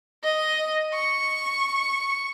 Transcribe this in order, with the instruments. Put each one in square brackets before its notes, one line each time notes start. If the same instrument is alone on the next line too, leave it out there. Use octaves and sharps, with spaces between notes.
[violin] D#5
C#6